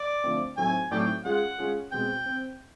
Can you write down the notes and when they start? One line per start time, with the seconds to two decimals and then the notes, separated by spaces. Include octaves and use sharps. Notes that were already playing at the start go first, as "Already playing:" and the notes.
Already playing: D5
0.24 D3 F3 A3 C4
0.57 A2 F#3 A3 C4 D#4 G#5
0.91 A2 F#3 A3 C4 D#4 D5 G5
1.24 G#3 C#4 F4 G#4 F#5
1.59 G#3 C#4 F4 G#4
1.92 B2 G#3 C4 G5
2.26 C4